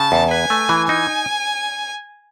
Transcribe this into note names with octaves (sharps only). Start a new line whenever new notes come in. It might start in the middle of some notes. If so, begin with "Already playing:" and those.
Already playing: C#3 A5
E2
B4 G#5
A3
E3
D#4 G#5